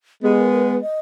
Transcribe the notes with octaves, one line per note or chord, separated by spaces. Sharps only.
G#3 B3 G4
A#4
A#4
B4
D#5